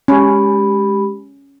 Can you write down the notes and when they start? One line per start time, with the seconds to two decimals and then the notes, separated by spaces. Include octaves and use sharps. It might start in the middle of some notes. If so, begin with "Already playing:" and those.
0.08 G#3 C#4 G4 B5